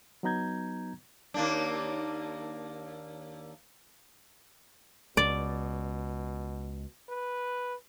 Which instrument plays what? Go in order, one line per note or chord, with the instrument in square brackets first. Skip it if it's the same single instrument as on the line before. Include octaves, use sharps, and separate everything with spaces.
[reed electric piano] F#3 B3 D#4 A#5 G6 G#6
[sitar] D#2 A#3 D4
[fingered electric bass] C#2 [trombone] B2 [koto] D5
[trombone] B4